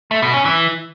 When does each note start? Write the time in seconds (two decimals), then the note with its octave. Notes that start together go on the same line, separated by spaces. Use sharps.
0.11 A3
0.22 B2
0.34 C#4
0.45 E3